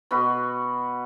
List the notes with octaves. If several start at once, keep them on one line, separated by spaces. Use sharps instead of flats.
B2 F#4 B4